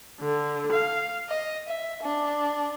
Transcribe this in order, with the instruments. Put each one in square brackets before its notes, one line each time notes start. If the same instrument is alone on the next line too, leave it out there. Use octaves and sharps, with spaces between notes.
[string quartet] D3
F5
D#5
E5
D4